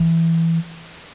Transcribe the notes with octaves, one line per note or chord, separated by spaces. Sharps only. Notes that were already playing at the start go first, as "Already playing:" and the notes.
Already playing: E3